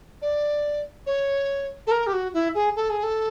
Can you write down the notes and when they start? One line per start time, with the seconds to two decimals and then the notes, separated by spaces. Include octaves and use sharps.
0.22 D5
1.06 C#5
1.87 A4
1.91 A#4
2.07 G4
2.13 F#4
2.34 E4
2.55 G#4
2.76 A4
2.90 G#4
3.03 A4